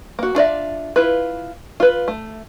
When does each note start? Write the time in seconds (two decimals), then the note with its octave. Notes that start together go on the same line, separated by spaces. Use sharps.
0.19 A#3 F#4
0.35 D4 F4 D5 E5
0.96 E4 F4 B4
1.80 F4 B4
2.08 A3